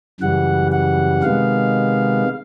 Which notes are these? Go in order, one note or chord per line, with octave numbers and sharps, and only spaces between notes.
F#2 C#3 E3 G3 F#5
F#5
C3 D#3 G#3 B3 F5